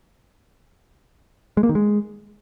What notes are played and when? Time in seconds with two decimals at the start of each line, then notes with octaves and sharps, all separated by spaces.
1.57 G#3
1.63 A#3
1.69 D#3
1.75 G#3